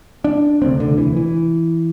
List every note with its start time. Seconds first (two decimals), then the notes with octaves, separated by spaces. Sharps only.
0.24 D4
0.61 E1 D2 C3 C4
0.80 D3
0.98 E3
1.17 E3